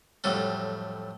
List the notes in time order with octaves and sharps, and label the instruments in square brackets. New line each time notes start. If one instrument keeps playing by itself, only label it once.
[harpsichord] F2 A2 F#3 G3 A4